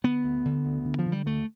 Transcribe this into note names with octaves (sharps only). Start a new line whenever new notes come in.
D3 B3
D2
D3
D2
D3
F3
D3
G3
D2 A3